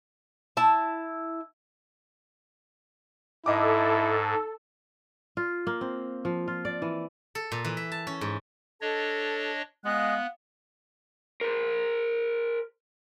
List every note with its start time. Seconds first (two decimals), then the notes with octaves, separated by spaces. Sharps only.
0.57 E4 A5
3.46 G#2 E4 A4 D#5 D6
5.37 F4
5.67 A#3
5.81 C4
6.25 F3
6.48 F4
6.65 D5
6.82 E3
7.35 A4
7.52 A#2
7.64 E3
7.77 E5
7.92 A5
8.07 C#4
8.21 G#2
8.81 D4 A4 C#5 D#5
9.85 G#3 B3 D4 F4 F#6
11.41 A#4 C5